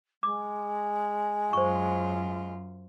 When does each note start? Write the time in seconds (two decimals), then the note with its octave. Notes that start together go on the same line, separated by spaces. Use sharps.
0.23 G#3 D6
1.53 F#2 F4 C5 C#6